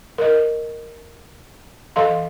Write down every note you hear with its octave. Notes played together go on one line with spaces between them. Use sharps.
A#4 D#5
E3 A4 D#5 F5 C6